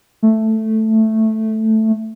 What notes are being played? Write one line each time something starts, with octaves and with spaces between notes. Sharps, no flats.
A3